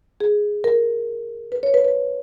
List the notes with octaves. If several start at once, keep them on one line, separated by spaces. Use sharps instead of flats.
G#4
A#4
B4
C#5
B4
B4